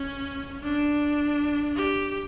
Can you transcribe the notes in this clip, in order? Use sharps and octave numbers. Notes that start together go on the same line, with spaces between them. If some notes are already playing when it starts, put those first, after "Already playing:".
Already playing: C#4
D4
G4